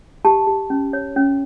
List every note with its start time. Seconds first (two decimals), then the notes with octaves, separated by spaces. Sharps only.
0.25 G4 A5
0.47 G4
0.70 C#4
0.93 C#5
1.16 C#4